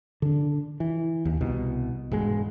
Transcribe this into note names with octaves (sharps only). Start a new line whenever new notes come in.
D3 D4
E3
D#2
C2 B2
E1 G#2 G#3